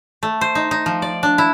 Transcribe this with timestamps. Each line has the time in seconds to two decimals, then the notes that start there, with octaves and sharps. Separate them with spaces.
0.23 A3
0.41 C5
0.55 D#4
0.71 D#4
0.86 F3
1.02 D5
1.23 D4
1.38 E4